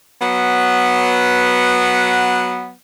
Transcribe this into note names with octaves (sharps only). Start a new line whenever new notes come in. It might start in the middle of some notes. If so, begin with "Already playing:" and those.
F#3 B3